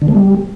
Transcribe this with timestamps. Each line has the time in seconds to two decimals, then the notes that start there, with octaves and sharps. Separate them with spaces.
0.02 D3
0.08 A3
0.15 G3